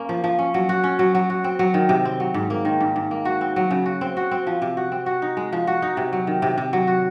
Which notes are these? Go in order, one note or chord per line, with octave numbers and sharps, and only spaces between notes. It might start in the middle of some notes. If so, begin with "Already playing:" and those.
Already playing: A#3 C#4
F3
F3
C#4
F#3
F#4
C#4
F#3
F#3
F#4
C4
F#3
D#3
C3
C4
F#3
G#2
A#3
D#3
G#2
G#2
A#3
F#4
C4
F#3
C#3
F#4
C4
F#4
C4
F3
C3
F#4
C4
F#4
D#4
G#3
F3
F#4
D#4
C3
F#3
D#3
C3
C3
F#3
F#4